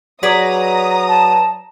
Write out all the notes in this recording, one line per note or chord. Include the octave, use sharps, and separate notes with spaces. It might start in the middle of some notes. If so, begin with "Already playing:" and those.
F#3 G#4 B4 D5 A#5 D#6
A5